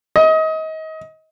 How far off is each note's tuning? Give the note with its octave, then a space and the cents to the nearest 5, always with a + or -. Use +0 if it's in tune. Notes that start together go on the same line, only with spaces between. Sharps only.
D#5 +30